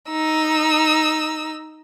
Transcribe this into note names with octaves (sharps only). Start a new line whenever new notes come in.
D#4 E6